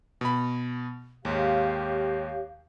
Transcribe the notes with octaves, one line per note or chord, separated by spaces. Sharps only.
B2 B5
D#2 G#2 G4 C#5 F5